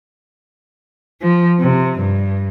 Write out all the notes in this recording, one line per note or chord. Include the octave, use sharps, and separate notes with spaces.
F3
C3
G2